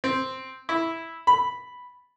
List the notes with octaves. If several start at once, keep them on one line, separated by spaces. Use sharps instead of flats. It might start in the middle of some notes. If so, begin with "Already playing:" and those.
C4
E4
B5